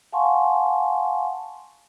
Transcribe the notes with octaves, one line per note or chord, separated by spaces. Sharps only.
F5 F#5 G#5 A5 C6 C#6